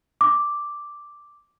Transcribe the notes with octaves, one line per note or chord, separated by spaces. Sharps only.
D6